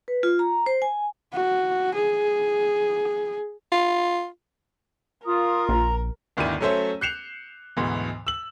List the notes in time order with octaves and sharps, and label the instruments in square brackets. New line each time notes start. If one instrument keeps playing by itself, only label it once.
[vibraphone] B4
F4
A#5
C5
G#5
[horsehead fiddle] F#4
G#4
[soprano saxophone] F4
[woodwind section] F4 [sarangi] A#4 [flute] D#6
[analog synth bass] A#1 [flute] A#5
[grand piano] G1 D2 D#3 D4 E4 D#7
F#3 A3 C#4 A4 C5 E5
F#6 G6 C7 C#7 E7 F7
D2 G#2 B2 E3
E6 F#7